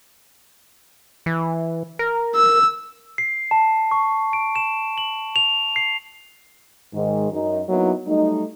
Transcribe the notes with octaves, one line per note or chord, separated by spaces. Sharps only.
E3
A#4
E6
C7
A5
C#6
D7
E7
F#7
F7
C7
G#2 D#3 G#3
F#2 D#4
F#3 A#3 B3 D#4 E4
F#3 G3 A3 D#4